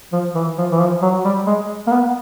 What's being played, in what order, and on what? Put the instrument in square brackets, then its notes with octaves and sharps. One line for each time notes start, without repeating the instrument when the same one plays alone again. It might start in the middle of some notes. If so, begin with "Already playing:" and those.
[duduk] F3
E3
F3
E3
F3
F#3
G3
G#3
A#3
B3